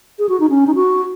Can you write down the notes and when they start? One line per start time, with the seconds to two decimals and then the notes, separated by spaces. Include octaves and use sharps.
0.19 G#4
0.29 F#4
0.40 D#4
0.50 C#4
0.67 D#4
0.75 F#4